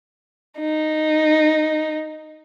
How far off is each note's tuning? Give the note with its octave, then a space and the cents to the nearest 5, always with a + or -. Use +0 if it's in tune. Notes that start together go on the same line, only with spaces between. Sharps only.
D#4 -5